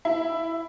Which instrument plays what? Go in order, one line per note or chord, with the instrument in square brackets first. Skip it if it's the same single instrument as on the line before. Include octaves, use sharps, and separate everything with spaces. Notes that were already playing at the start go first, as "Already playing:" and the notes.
[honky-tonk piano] E4